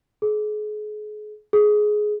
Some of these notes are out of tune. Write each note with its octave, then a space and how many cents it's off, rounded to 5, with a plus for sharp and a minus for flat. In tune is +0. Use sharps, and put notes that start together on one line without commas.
G#4 +35
G#4 +15